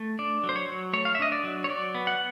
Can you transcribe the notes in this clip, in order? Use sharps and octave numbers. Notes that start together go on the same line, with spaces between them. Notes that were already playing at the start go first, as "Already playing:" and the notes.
Already playing: A3
D4 D5
F#3
C5
C#5
F#3
A3 C#5
F5
E5
D4 D#5
D5
F#3
C#5
F#3 D5
B3
F#5